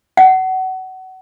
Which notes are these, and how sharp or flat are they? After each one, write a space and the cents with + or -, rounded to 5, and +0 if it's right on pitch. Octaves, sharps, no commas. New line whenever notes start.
F#5 +25